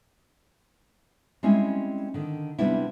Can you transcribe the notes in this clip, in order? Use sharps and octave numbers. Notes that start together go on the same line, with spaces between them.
G3 G#3 C4 C#4 E4
D3 D#3
C3 G3 B3 D4 E4